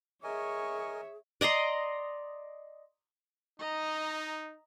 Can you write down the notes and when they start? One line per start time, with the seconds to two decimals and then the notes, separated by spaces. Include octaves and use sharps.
0.24 G#4 A#4 C#5 D#5 E5 G#5 C#6
1.41 D5 D#5 A#5 C6
3.59 D#4 D#5 A#5